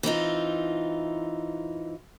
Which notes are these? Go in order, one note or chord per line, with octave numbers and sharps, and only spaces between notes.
E3 C4 D#4 F4